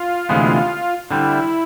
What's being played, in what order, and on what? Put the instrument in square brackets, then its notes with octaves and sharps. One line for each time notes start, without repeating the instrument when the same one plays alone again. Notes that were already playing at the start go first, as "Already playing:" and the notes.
Already playing: [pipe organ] F4
[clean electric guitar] D2 C3 E3 G#3 B3
[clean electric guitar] D3 G3 C4 [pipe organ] E4